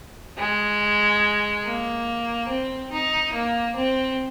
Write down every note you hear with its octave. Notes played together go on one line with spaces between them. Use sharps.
G#3
A#3
C4
D#4
A#3
C4